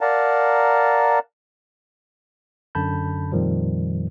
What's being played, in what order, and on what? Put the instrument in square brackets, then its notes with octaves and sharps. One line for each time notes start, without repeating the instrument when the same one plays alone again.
[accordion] A#4 D5 F5 F#5 A5 A#5
[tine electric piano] F#2 D3 A5 B5 G6
F2 A#2 D#3 F3 G3